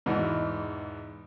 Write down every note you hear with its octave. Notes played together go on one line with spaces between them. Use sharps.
E2 G#2 B2 E3